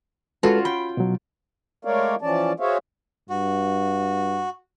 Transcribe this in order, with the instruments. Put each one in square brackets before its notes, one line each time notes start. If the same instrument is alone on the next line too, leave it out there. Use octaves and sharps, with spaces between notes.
[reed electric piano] G#3 A4 B4 [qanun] C#4 F4 F#4
[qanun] G5 [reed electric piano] B5
[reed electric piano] B2 F#3
[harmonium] G#3 A3 A#4 C#5 D5 F5
E3 F3 C#4 D5 A5
F#4 G#4 C5 C#5 E5 F5
[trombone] G2 [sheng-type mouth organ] F#4